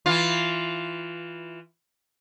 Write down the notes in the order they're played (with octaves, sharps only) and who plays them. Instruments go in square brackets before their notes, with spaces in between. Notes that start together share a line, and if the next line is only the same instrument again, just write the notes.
[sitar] E3 F4